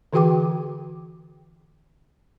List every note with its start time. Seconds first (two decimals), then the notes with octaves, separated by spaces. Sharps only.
0.13 D3 E3 F#4 G#4 G5 D6